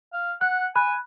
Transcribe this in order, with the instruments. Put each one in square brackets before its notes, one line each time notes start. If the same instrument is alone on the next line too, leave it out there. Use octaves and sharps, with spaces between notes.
[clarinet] F5
[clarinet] F#5 [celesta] F#6
[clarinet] G#5 [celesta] B5 F#6